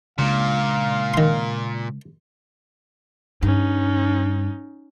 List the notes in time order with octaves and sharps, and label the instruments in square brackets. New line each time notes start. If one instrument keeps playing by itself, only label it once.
[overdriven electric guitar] A#2 [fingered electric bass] C#3 G#3 D4 [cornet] F5
[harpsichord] D#3 C6
[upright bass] G2 [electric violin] C#4 D#4